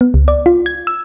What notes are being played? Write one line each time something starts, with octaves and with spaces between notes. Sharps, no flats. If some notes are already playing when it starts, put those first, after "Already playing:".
B3
C#2
D5
F4
G#6
E6